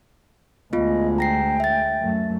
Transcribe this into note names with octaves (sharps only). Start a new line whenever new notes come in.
D2 G#3 B3 F4 D#5
G5 A#5 A#6 C7
E5 A6
F#2 A3